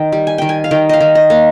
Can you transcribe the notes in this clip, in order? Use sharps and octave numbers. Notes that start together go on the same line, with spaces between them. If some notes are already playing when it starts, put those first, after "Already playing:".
Already playing: D#3 G5
G3
G#5
D#3 G5
G#5
F5
D#3 G5
D#5 F5
D#3
D#5
A#3